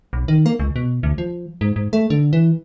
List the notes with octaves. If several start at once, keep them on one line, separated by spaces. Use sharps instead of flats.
B1
D#3
A#3
C#2
B2
D2
F3
G#2
G#2
A3
D3
E3